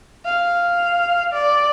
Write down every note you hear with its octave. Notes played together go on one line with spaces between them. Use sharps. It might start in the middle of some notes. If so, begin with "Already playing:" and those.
F5
D5